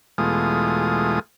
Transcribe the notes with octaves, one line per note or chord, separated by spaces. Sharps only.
E2 B2 G#3 A3 F4 D#6